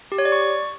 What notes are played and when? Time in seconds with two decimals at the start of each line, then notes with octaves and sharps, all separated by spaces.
0.12 G4
0.18 C#5
0.25 D5
0.32 C#6